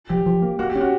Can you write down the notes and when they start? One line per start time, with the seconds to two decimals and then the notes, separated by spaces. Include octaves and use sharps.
0.09 F3 G4
0.26 F3
0.42 A#3
0.59 A#3 F#4
0.70 G4
0.75 C#4
0.80 F#4